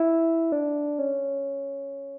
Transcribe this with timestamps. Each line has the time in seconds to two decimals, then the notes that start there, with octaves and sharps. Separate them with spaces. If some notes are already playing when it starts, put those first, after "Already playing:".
Already playing: E4
0.52 D4
0.99 C#4